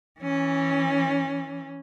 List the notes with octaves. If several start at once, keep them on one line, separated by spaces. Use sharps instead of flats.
E3 C#4